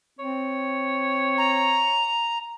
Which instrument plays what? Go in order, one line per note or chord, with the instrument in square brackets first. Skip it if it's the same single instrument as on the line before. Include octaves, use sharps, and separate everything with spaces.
[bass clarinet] C4 [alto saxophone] C#5
[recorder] A#5